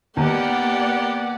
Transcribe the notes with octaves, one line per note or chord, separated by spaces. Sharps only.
D#2 A#3 B3 G4 D5 F#5